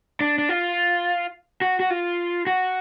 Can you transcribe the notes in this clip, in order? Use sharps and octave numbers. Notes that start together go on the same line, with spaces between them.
D4
D4
F4
F#4
F#4
F4
F#4